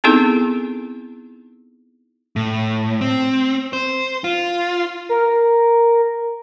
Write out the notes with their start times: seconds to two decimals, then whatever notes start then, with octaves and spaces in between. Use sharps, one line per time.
0.04 B3 C4 D#4 E4 G#4 A4
2.36 A2
3.01 C4
3.73 C5
4.24 F4
5.09 A#4